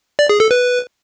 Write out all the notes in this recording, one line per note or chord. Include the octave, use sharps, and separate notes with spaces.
D5
G#4
A4
B4